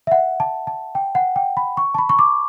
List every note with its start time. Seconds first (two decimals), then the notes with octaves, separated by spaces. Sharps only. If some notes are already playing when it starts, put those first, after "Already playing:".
0.07 E5
0.11 F#5
0.40 A5
0.67 A5
0.95 G5
1.15 F#5
1.36 G5
1.57 B5
1.77 C#6
1.94 A5
1.98 B5
2.09 C#6
2.19 D6